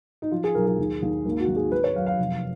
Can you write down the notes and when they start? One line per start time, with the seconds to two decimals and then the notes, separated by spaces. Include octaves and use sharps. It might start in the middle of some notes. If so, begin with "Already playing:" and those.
0.22 D#4
0.32 F3 F4
0.44 G#4
0.55 B1 A#4
0.66 G#4
0.78 D#2
1.02 D#2
1.25 G#1 A#3
1.40 F#4
1.48 G#1
1.56 G#4
1.72 G#1 B4
1.84 C#5
1.95 F#2 F5
2.06 F5
2.18 F1